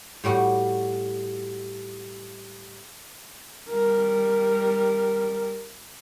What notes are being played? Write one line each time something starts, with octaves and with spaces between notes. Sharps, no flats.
A2 G3 F#4
G3 A#4